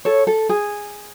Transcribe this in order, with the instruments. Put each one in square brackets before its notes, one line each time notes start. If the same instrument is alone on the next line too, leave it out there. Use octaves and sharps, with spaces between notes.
[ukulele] A4 C#5
A4
G#4